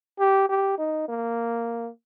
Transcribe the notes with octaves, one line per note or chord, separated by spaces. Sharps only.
G4
G4
D#4
A#3